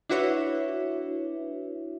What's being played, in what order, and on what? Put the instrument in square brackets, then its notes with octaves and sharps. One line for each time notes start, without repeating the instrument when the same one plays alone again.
[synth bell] D4 E4 F#4 B4 C#5 E5